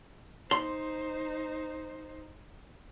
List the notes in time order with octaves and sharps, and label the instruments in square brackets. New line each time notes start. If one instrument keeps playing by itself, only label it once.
[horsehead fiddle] D#4 C5 [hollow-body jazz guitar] C6